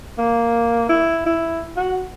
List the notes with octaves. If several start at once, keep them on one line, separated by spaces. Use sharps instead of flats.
A#3
E4
E4
F#4